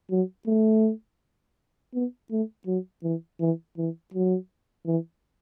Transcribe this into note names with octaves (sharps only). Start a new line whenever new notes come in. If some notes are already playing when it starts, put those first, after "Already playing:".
F#3
A3
B3
A3
F#3
E3
E3
E3
F#3
E3